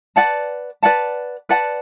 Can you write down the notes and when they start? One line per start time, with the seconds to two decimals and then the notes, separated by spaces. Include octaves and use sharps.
0.16 B4 D5 F#5 A5
0.83 B4 D5 F#5 A5
1.49 B4 D5 F#5 A5